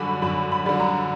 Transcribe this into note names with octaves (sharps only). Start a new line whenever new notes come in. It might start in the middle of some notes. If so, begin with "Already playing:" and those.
Already playing: F#2 D3 G3 B5 C#6 D6
F#2 B5
B5
D3 G3
A#5